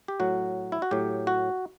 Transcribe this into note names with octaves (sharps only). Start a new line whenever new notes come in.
G4
A2 F#3 F#4
E4
F#4
A2 F#3 G4
F#4